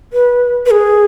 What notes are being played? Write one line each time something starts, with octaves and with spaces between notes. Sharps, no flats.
B4
B4
G#4